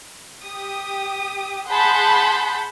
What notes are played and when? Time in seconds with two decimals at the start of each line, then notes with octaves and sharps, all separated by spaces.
0.42 G4 D#6
1.67 G#4 F#5 A5 B5 C6 G6